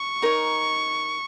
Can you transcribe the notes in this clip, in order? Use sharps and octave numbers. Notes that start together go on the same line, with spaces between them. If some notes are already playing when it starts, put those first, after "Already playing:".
Already playing: C#6
D#4 A#4 C#5